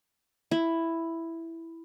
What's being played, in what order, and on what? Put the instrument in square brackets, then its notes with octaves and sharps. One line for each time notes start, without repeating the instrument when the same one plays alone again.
[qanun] E4